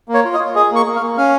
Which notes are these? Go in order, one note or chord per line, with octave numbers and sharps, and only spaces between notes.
A#3
C#5
F4
D#5
F4
G#4 D#5
A#3 C#6
A#3
F5
A#3
C#4 F5